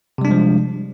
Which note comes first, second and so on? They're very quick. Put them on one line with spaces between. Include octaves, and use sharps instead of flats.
C3 G3 D4 G#3 F3